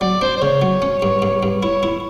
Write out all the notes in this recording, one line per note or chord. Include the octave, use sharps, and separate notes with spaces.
F#3 D5
D4 C5
C5
C#3 C#5
F#3
C#4
G2
G2
G2
E4 C#5
E4